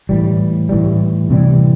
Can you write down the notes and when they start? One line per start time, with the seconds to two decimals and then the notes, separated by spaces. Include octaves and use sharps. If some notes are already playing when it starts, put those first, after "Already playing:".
0.09 A2 E3 G3
0.69 A2 E3 G3
1.30 C3 E3 G3